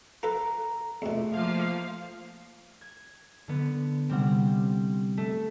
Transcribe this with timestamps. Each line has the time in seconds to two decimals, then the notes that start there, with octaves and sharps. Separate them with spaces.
0.23 F4 A4 B4 A#5
1.02 E2 B2 A3 F4
1.33 F3 A#3 F5
2.81 G#6
3.48 D3 B3
4.09 C3 G3 C4 F#5
5.17 A3